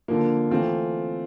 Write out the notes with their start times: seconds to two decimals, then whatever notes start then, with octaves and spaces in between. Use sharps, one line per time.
0.08 D3 F3 A#3
0.50 E3 A3 C4 F4